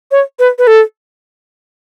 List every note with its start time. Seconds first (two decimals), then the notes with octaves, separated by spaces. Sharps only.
0.11 C#5
0.39 B4
0.59 B4
0.67 A4